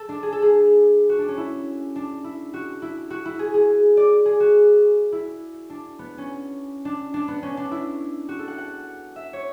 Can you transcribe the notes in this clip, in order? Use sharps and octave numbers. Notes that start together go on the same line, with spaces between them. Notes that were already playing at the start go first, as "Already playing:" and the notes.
Already playing: A4
D4
G#4
A4
G#4
F#4
D4
C#4
E4
D4
E4
F#4
E4
F#4
E4
G#4
G#4
D5
G#4
F#4
E4
D4
B3
C#4
D4
D4
B3
C#4
D4
E4
F#4
A4
F#5
F#5
E5
C#5